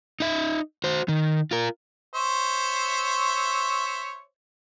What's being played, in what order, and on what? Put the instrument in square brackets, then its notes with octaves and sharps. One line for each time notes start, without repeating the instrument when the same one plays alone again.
[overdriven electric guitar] D#4 E5
F#4 C5
D#3
F4 A#4
[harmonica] C5 C#5 E5